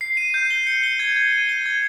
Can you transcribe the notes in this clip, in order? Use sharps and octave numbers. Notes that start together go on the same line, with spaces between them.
C7
D#7
G6
G7
C#7
G7
G#6
G#6
D#7
G7
G#6